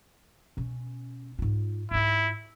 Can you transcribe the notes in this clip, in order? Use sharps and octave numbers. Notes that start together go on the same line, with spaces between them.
B2 C#4
G#2 F4
G#2 E4 F4